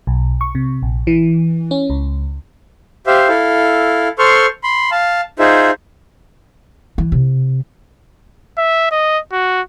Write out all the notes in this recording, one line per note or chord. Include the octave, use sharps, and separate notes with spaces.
B1
C#6
C3
A#1
E3
C#4
C#2
G4 C5 E5 F5
E4 A4 F5
A4 C5 C6 C#6 F6
B5 C6
F5 A5
D#4 F4 G#4 C5 E5
E3
C3
E5
D#5
F#4